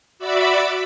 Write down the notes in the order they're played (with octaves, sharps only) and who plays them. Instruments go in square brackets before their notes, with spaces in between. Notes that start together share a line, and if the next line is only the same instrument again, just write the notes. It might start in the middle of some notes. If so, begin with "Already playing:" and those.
[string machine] F#4 D5 E5 B5 D6 E6